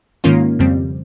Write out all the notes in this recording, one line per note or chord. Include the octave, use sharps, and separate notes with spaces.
G#2 D#3 A#3 C#4 F4
F2 C#3 G3 C4